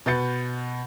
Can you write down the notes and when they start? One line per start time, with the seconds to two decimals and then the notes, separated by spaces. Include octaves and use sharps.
0.06 B2 B4 G6 A6 C#7